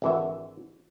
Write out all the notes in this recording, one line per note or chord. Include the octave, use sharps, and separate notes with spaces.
G#1 D3 E3 E4 F#4 E5